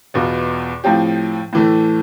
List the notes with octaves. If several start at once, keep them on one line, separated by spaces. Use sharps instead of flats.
E2 B2 B3 F4
A2 F3 C4 G4
A2 E3 A3